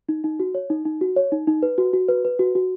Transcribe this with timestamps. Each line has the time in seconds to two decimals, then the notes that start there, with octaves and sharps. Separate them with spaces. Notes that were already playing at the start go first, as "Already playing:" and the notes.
0.09 D#4
0.24 D#4
0.40 F#4
0.55 C#5
0.70 D#4
0.85 D#4
1.01 F#4
1.16 C#5
1.32 D#4
1.47 D#4
1.63 B4
1.78 F#4
1.93 F#4
2.09 B4
2.25 B4
2.39 F#4
2.55 F#4